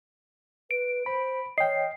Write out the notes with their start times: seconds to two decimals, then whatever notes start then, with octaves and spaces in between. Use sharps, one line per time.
0.71 B4 D7
1.06 C5 B5
1.58 C#5 D#5 G5 C7